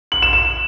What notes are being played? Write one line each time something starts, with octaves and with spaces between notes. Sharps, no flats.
F#7
E7
E7